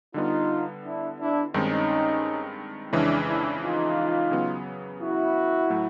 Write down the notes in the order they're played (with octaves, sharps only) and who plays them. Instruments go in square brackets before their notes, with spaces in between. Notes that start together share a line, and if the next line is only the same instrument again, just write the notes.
[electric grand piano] D3 G3 B3 [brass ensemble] D#4 F4
[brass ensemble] D4 E4
D4 E4
[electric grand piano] G2 D#3 G#3 C4 [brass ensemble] C#4 D#4
[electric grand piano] F2 C#3 E3 G#3 C#4 [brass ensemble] D4 E4
[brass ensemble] D4 E4
D#4 F4
[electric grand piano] C#3 F#3 B3
[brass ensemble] E4 F#4
[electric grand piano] A2 F#3 A3